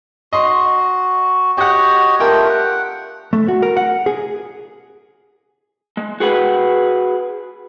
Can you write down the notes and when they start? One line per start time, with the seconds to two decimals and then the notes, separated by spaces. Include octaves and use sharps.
0.33 F#4 D#5 C6
1.57 F#4 G4 C#5 D#5 F#5
2.20 A3 D4 F4 G4 A#4 G5
2.49 F#5
3.33 A3
3.48 F#4
3.62 A#4
3.77 F#5
4.06 G#4
5.97 G#3
6.20 F#4 G#4 B4 F#5